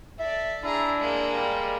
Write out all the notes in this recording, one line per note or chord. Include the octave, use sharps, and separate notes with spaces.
A4 D5 E5
D4 E4 G#4 A#5
G#3 A#3
G3